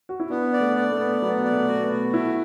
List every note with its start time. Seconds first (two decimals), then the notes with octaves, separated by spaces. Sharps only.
0.09 F#4
0.20 E4
0.30 B3 D4
0.53 D5
0.60 A3
0.76 D5
0.92 A3
0.99 B3
1.22 F#3 B3
1.45 D5
1.52 A3
1.68 F#4
1.83 B3
1.91 F#4
2.14 A3 E4